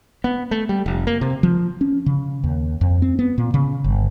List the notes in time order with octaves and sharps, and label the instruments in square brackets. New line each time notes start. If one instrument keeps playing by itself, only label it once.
[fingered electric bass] B3
A3
G3
F1
A#3
C3
[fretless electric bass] F3
C#4
C#3
D#2
F2
C4
B3
A#2
C#3
G1